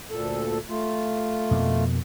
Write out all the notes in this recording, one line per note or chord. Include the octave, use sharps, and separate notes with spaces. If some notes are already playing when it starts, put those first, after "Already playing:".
D2 A#2 A4
A3 F4
F2 B2 A#3